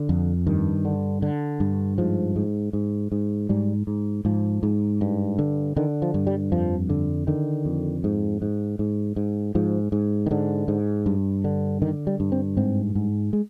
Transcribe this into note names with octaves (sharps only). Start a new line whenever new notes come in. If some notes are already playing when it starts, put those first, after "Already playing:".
Already playing: D3
F2
G2 D#3
D3
D3
G2
G#2 F3
G#2
G#2
G#2
G#2 G3
G#2
G#2 F3
G#2
G2
D3
D3 D#3
F3
G2
G3
F2 F3
D3
D3 D#3
F2
G#2
G#2
G#2
G#2
G#2 F3
G#2
D#3
G#2 D3
G#2
G2
D3
D3 D#3
G3
G2
C4
G#2 C4
G#2
G#3